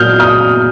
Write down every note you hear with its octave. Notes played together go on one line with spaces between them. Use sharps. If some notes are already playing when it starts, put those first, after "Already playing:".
Already playing: A#2 F#3 D#6 F6 G6
D#6 F6